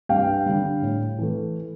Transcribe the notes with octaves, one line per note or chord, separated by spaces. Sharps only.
G2 F5 G5
D3 G3
A2
E3 A3